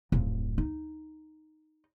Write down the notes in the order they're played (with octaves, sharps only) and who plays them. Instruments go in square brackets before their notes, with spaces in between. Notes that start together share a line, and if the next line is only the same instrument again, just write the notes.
[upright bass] D1 F2
D#4